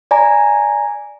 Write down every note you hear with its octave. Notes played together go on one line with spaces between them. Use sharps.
D5 G#5 A#5